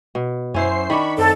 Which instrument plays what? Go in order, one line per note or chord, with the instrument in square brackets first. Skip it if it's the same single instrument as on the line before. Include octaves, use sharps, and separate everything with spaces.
[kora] B2
[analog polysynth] F#2 C5 C7 [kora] C#4 E4
[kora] D#3 D4 [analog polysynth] B5 C#6
[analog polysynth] F#2 C4 [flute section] A4